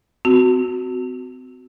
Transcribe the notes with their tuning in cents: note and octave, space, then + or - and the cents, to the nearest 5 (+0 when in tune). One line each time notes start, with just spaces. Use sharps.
C4 -35 F#4 +0